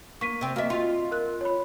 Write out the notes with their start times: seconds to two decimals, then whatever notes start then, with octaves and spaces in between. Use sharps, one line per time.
0.21 A#3 C#6 B6 D#7
0.41 C3 C4
0.56 A#3 F#4 D#5 E5
0.70 F4
1.11 A#4 F#6
1.41 C#5 B5